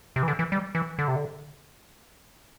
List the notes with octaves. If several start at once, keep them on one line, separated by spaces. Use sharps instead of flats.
C3
E3
D3
E3
G3
E3
D3
C3
D3